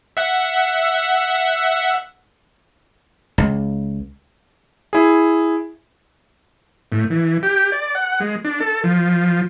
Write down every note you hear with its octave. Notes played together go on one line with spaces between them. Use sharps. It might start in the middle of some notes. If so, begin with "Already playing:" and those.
E5 F#5
C#2
E4 G#4
A2
E3
G4
D5
F#5
G#3
D4
A4
F3